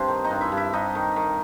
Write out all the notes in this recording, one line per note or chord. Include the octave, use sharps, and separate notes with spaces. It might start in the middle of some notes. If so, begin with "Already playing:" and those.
Already playing: G2 C4 C5
D#3
D#4 D#5
G2
E4 E5
G2
E4 E5
G2 D#4 D#5
D#3
D#3